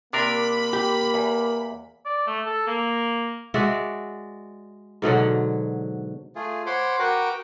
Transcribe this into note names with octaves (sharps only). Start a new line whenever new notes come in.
C3 A#3 D4 A#4 B5
G4
E2
D5
A3
A4
A#3
G#3 F#4 D5 E5
G#2 B2 D3 F#3
A3 F4 G#4
C5 C#5 F#5 B5 C6 D6
F#4 A#4 B4 F#5 G5 D6